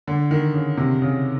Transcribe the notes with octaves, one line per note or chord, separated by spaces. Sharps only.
D3
D#3
C#3
C3
C#3